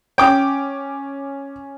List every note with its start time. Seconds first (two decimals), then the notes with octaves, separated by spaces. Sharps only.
0.18 C#4 G5 D6